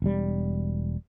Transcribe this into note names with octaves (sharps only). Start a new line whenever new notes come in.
E1 G3